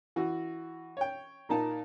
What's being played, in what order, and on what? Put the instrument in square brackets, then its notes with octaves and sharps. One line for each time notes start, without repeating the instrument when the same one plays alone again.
[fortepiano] E3 F#4
C#5 G5
A#2 A#3 D#4 A5